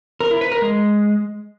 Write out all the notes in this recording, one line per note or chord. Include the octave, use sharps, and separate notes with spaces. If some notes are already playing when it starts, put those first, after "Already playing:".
A#4
E4
B4
A#4
G#3